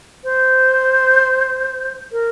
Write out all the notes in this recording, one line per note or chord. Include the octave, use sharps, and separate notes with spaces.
C5
A#4